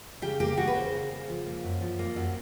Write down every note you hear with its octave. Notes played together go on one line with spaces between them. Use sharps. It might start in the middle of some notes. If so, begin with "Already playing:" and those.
C#3 G4
A#3 G4
A#3 F#4
B4
C#3 C5
A#3
C#3
F3
A#3
F#2
F3
A#3
F#2